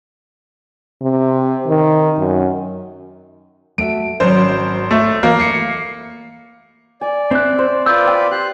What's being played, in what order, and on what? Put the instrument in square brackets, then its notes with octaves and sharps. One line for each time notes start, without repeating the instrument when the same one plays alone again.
[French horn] C3
D#3
F#2
[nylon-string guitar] A3 F#4 E5 [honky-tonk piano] D7
[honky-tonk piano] G#1 C#4 C5 [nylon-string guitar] G#2 F#3
[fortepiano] A3
[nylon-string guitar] E3 [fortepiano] A#3
[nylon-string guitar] A3 [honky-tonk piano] C7 C#7
[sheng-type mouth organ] D5 [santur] G#5
[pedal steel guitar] C4 F#6 [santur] E5
[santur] C5
[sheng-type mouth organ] F4 B4 D5 [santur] D6 [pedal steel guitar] E6 G6
[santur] G5
[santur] G4 [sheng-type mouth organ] C5 F#6